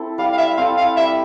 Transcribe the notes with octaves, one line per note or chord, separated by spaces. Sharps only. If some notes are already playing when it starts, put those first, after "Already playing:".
Already playing: C4 E4 A4
G3 F5
F5
E5
C4 E4 A4 F5
F5
G3 E5